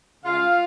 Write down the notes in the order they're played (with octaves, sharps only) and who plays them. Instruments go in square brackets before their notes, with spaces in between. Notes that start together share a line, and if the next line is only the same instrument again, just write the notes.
[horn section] C#3 G#3 F4 F5